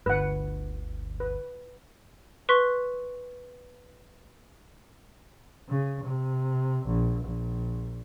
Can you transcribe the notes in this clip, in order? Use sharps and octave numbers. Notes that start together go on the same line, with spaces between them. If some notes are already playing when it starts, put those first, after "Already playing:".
G1 D2 B4 F#5
B4
B4 C6 C#6 F#6 B6
C#3
C3
A#1
A#1